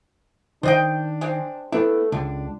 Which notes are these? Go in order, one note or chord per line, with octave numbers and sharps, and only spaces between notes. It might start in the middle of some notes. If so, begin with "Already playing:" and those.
D#3 D4 C5 D#5 G5
G#3 C4
A3 B3 D4 E4
C#2 D3 D4